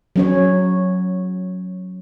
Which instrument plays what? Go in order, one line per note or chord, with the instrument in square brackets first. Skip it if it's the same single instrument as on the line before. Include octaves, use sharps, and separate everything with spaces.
[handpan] F#3 C#4 C#5